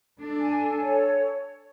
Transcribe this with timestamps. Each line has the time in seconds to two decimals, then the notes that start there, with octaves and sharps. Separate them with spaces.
0.19 D4 A4
0.40 G#5
0.60 A4
0.80 C#5